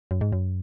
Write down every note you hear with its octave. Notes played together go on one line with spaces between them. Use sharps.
F#2
G#2
F#2